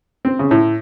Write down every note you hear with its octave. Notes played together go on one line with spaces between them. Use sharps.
C4
C#3
A2